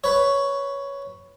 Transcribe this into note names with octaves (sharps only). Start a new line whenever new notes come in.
B4 C#5